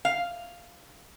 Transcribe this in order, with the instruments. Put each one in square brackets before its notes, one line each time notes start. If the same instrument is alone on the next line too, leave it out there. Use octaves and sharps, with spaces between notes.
[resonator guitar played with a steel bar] F5